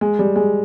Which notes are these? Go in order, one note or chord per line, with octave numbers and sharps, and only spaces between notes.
G#3
G3
G#3